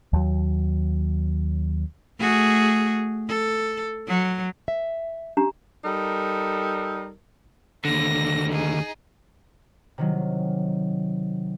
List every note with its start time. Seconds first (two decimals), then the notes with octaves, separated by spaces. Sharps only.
0.13 D#2 F#3
2.19 A3 F#4 G#4
3.28 A4
4.07 F#3
4.68 E5
5.37 D4 G4 A#5
5.85 G3 D#4 A4 A#4
7.85 D#2 D3 A#6
8.50 D#4 G#4
9.98 C3 D#3 F#3